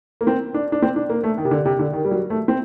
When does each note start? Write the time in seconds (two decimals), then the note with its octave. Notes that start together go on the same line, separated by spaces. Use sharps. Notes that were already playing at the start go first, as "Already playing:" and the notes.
0.21 A#3
0.27 C4
0.54 D4
0.72 D4
0.82 C4
0.96 D4
1.10 A#3
1.24 A3
1.38 D#3
1.45 C3
1.51 D3
1.65 C3
1.79 D3
1.93 D#3
2.05 G3
2.11 F#3
2.30 A3
2.48 C4